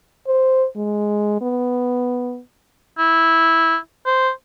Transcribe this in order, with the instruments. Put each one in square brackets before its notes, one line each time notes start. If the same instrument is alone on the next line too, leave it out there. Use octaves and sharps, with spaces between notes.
[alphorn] C5
G#3
B3
[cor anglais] E4
C5